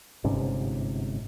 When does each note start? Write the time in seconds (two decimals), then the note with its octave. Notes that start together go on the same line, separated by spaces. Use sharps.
0.24 G1 G#2 C3 C#4